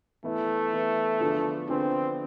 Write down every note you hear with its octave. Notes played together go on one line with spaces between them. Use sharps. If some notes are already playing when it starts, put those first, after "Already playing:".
E3 A3 B3 E4
E3 B3 E4
D3 F3 B3 D4 G#4
D3 F3 B3 C4 D4 G#4